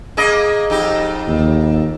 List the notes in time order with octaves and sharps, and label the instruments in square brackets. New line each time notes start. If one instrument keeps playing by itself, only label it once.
[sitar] A#3 G#4 D#5
F2 D#4 G4
[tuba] D#2